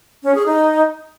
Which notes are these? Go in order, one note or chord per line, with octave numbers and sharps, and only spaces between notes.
C#4
G#4
D#4